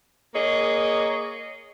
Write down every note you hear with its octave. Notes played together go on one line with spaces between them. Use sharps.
A#3 G#4 C#5 D#5